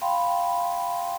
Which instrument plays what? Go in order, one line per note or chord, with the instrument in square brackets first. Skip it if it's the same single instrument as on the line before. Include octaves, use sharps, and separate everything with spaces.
[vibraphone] F5 G5 B5 C6